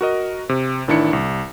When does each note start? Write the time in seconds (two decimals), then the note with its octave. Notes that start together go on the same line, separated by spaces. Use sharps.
0.01 F#4 A#4 D#5
0.49 C3
0.88 A1 D#3 D4 E4 C#7
1.13 C2